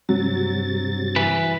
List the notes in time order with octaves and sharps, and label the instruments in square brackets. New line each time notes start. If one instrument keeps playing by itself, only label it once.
[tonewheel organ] G2 C3 A6 [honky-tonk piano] F#3
[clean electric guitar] E3 B4